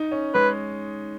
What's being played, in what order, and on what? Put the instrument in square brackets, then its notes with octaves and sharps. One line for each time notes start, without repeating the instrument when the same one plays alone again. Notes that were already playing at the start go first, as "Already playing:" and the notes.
Already playing: [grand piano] D#4
C#4
[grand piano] G#3 [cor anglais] B4